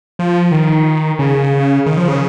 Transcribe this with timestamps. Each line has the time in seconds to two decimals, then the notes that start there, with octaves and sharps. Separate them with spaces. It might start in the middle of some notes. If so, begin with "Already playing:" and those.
0.19 F3
0.52 D#3
1.19 C#3
1.86 D#3
1.97 F3
2.08 C#3